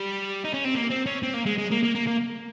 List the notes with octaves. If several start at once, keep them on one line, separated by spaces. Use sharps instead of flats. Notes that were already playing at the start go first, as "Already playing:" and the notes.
Already playing: G3
D#4
C#4
C4
A#3
C4
C#4
C4
A#3
G#3
G#3
A#3
A#3
A#3
A#3